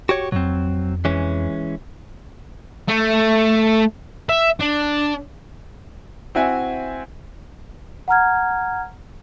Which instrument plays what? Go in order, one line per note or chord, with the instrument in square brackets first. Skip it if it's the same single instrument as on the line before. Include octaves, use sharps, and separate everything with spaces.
[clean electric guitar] F#4 G4 C#5
[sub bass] F2 [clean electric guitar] F#3 C4
[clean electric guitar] E3 G#3 C#4
[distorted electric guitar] A3
E5
D4
[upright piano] C4 E4 F#4 E5 F#5 G#5
[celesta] F#5 A#5 F6 G#6